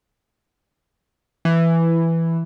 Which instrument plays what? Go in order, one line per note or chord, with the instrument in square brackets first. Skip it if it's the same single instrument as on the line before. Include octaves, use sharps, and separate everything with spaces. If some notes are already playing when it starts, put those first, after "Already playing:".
[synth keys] E3